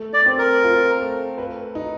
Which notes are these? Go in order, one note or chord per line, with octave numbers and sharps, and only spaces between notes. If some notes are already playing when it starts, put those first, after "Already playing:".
Already playing: A3
D5
C4
A#4
F4
A3
B4
D#4